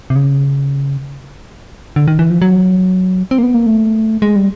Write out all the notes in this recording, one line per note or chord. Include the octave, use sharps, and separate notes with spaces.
C3
C#3
D3
D#3
E3
F3
F#3
C4
A#3
B3
A#3
A3
G#3
G3